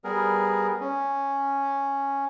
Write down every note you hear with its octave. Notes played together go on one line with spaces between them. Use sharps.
G3 B3 G#4 A#4
C#4